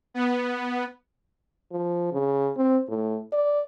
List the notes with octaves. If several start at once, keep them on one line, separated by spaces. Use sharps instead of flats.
B3
F3
C#3
C4
A2
D5